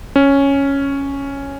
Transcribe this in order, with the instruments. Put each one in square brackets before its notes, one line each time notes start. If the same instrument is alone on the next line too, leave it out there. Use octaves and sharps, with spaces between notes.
[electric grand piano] C#4